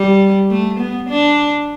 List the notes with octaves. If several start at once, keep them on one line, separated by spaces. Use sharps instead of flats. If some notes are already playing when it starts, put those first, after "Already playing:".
Already playing: G3
A3
B3
D4